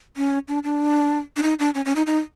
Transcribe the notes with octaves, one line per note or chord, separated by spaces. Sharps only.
C#4
D4
D4
D4
D#4
D4
C#4
C#4
D#4
D#4